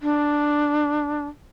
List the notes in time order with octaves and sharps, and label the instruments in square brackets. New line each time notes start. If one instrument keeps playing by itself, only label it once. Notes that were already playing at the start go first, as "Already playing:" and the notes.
[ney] D4